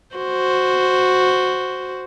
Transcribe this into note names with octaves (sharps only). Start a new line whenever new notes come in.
F#4 C5